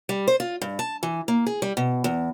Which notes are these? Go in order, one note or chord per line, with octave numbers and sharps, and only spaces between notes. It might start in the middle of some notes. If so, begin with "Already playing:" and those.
G3
C5
F4
G2
A5
E3
A#3
G#4
G3
B2
E2